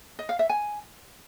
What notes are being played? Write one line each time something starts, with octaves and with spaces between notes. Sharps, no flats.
D#5
F5
E5
G#5